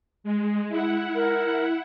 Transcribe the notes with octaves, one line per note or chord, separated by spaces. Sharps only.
G#3
E4 F#5
A#4